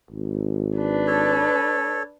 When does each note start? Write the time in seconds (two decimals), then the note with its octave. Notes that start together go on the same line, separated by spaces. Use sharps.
0.11 G#1
0.77 D4 B4
1.07 A4 C#5